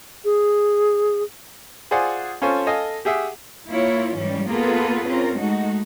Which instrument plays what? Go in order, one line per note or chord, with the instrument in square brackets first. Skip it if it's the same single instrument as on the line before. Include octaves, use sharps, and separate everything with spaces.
[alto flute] G#4
[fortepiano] F4 G#4 C5 D5 F#5 G#5
C#4 F4 A4 C5 G#5 C#6
A4 D#5 F5 G#5
G4 G#4 E5 F#5
[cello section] A#3 E4 F4 C#5
G#2 E3 G3 C#4
A#3 B3 F4 G#4 A4 B4
C4 C#4 F4 A#4
G#3 A3 D#4 F#4